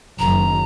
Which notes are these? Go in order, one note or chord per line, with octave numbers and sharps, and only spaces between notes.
F#1 F#2 D#3 A#5